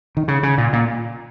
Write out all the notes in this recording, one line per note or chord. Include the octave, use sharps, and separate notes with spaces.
D#3
C#3
C#3
A#2
A#2